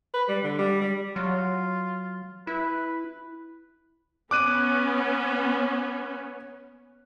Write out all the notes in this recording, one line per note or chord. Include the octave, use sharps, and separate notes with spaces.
B4
G3
D3
G3
G3
F#3 F4
E4 B4
B3 C#4 D6 F#6 D#7